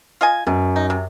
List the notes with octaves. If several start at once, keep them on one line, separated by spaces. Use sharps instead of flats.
F4 D#5 G#5
F#2 B2
D#4
C3